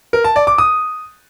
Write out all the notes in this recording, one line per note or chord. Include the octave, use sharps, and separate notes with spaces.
A#4
A5
D5
D6
D#6